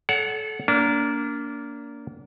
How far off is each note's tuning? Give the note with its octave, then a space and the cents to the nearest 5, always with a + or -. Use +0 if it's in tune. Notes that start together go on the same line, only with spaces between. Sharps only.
A4 -25 C#5 +35 F#5 +0
A#3 +0 D4 -30